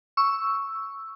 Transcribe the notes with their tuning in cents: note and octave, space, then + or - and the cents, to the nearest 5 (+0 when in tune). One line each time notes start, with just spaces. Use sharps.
C#6 +0 E6 +0